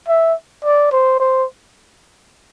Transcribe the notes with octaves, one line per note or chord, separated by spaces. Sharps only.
E5
D5
C5
C5